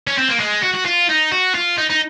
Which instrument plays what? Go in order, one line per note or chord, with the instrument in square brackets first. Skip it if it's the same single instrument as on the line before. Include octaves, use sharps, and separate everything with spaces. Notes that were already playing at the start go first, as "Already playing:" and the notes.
[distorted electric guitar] C#4
C4
A#3
G#3
F#4
F#4
F4
D#4
F#4
F4
D#4
D#4